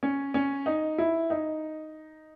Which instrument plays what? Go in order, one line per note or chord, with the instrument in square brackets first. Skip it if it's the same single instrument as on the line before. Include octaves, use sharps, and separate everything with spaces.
[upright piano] C#4
C#4
D#4
E4
D#4